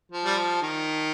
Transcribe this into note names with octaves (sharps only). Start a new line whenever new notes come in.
F3
G3
F3
D#3